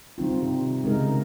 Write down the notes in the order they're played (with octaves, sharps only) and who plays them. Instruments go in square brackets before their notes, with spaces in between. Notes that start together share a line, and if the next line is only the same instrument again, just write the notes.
[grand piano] D#3 [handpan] G3 C4 F4
[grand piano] C3
[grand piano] C#3 [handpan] G#3 D#4 A#4